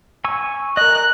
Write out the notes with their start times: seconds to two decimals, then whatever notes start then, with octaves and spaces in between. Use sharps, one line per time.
0.25 G#5 C#6 E6
0.77 A#4 D#5 F#6